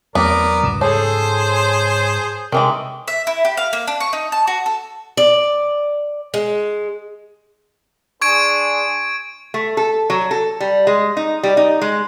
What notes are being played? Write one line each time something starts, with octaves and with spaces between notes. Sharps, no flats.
E2 F#3 A3 B3 C4 D4 A#4 D5
C2 G#2 C#3 D#6 E7
G#4 A4 C5 C#5 A5
C3 D#3 E3 G#3
E5
E4
G4
F5
A#3
D4
C#6
D#4
A5
F#4
A4
D5
G#3
D4 G#4 C5 C#6 G#6 D7
A3
A4
F#3
A4
G3
G#3
D#4
G3
D#4
G#3